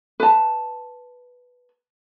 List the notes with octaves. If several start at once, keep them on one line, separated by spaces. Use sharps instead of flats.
B4 A5